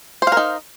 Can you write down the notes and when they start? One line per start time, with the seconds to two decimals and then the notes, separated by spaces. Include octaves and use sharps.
0.22 C5
0.27 F5
0.32 A#4
0.37 D#4